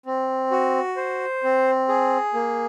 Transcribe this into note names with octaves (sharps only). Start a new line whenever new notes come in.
C4
F#4
C5
C4
G#4
A#3